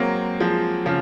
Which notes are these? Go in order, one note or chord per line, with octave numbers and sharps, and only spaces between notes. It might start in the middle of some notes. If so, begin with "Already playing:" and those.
Already playing: F#3 G#3 A#3 C4
F3 G#3
C#3 F3